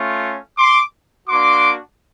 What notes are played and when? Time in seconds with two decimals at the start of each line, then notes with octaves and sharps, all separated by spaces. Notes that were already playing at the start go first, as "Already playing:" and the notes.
Already playing: A3 C#4 F4
0.57 C6 D6
1.28 A#3 D4 F#4 C6 D6